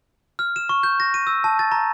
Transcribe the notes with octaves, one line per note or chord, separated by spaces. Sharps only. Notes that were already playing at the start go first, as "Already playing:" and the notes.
F6
E7
C#6
G6
A#6
D#7
E6
A5
A6
A#5